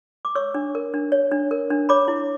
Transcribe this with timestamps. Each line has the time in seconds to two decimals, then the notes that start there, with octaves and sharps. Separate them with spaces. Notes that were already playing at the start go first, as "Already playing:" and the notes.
0.25 D6
0.35 C#5 C#6 E6
0.54 D4
0.75 A#4
0.94 D4
1.12 C#5
1.31 D4
1.51 A#4
1.70 D4
1.89 C#5 B5 D6
2.08 E4